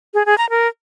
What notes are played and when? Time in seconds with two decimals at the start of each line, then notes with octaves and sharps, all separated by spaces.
0.14 G#4
0.26 G#4
0.38 A#5
0.50 A#4